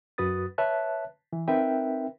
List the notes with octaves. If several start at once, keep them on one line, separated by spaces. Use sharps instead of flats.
F#2 F#4 B4 D#6 A6
B4 C#5 E5 A5 F#6
E3
C4 D#4 A#4 B4 E5 G5